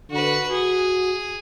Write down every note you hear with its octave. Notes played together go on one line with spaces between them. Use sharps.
D3 F#4 B4
F#4 G#4